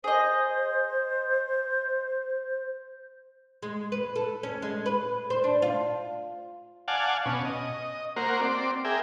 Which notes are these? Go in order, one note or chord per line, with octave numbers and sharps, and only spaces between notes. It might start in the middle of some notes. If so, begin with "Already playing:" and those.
G#4 C5 D#5
G#3
B4
A4
C#4
G#3
B4
C5
D4
F4
D5 F5 F#5 G#5 A5
B2 C#4
D#5
A#3 F#4 A#4 C5
C4 D5
G#4 A#4 E5 G5